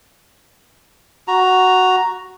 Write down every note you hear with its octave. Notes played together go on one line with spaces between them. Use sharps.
F#4 A#5